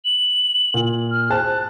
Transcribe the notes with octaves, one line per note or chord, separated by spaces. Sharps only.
F#7
A#2
F6
G#4 C5 A5 F#6